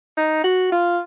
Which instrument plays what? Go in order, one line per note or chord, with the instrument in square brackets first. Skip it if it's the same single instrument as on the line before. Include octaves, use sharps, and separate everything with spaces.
[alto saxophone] D#4
F#4
F4